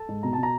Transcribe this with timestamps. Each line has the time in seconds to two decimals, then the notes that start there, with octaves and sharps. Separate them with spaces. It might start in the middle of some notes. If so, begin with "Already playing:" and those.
Already playing: A4 A5
0.09 G#2
0.23 B2 A#5
0.33 B2 A5
0.43 A#5